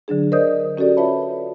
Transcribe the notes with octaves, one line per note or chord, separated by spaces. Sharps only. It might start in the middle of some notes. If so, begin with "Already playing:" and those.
D3 F#3 D4 G#4
A#4 C5 D5 D#5 D#6 G6
C#4 F#4 G4 A4 D5
F4 B4 C#5 E5 A5 B5